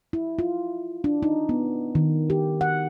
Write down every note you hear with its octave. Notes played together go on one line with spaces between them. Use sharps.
E4
F4
D4
D#4
B3
D#3
G4
F#5